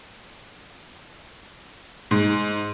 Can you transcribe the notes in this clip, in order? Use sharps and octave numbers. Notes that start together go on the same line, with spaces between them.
G#2